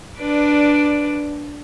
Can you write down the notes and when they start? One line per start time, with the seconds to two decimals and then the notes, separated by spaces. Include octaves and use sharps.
0.20 D4 B4 D5